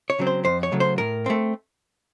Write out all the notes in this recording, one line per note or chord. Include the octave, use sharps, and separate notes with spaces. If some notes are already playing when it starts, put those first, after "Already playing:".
C#5
C#3 F#3 C4
C5
F2 C5
C#5
C#3 F#3 A3
C5
A2 A#4
A3 C4